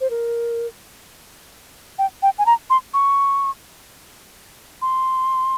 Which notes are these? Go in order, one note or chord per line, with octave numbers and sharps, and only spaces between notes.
C5
A#4
G5
G5
G#5
A#5
C6
C#6
C6